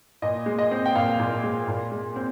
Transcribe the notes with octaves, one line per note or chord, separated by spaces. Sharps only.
A#2 D#5
G#3
D#5
C4
G5
A#2 F5
A#2
G#3
A#2
G#3
C4